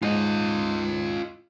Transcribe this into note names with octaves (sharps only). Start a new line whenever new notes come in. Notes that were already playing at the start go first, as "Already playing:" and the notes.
G#2 F4 D#5